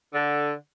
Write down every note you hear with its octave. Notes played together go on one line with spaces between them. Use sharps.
D3